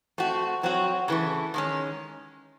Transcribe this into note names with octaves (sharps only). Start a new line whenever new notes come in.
A3 C4 F#4
F#3 C4 F#4
C#3 E3 A3
D#3 G#3 C#4